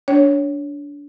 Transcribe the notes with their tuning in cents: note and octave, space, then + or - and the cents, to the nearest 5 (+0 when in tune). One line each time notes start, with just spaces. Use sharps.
D4 -25 C#5 +0 G5 -20